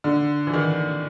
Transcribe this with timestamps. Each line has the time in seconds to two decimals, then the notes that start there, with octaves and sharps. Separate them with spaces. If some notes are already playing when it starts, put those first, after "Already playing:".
0.04 D3
0.47 E3
0.54 D#3